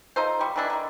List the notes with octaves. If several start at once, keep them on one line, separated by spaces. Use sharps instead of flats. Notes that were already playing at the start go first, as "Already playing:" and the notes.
D#4 F4 A4 C5
G3 C#6
D#3 E3 D4 E4
D3 D#3